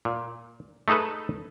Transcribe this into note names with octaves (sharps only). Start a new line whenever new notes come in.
A#2
A3 D#4 G#4 A4 B4